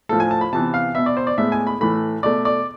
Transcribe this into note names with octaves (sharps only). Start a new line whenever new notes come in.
A2 F3 A3 A4
G#5
A5
B5
C3 E3 B3 A5
F5
B2 B3 E5
D5
C5
D5
A2 G#3 B3 E5
G#5
B5
A2 E3 A3 B5
B2 A3 D5
D5